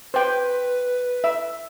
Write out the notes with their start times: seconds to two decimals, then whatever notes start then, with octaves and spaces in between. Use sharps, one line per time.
0.14 B4 C5 G5
1.24 E5